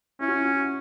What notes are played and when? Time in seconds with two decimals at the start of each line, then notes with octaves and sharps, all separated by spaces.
0.20 C#4 E4
0.28 F#4
0.36 E4
0.44 F#4